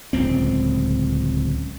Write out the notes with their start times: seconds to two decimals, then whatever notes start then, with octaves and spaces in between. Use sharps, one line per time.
0.13 D1 C#2 C4